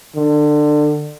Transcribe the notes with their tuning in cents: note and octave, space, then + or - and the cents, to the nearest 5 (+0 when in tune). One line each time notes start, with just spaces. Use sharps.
D3 +25